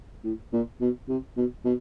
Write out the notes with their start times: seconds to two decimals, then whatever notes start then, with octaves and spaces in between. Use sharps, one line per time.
0.24 A2
0.53 A#2
0.81 B2
1.08 C3
1.36 B2
1.65 B2